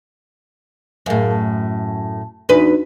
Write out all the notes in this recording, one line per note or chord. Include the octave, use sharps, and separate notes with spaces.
F#2 A2 G#4 A#4 F5
A5
E2 D4 D#4 F#4 B4